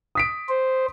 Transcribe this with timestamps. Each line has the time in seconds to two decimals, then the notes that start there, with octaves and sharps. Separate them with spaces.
0.15 D#6 B6 D7
0.49 C5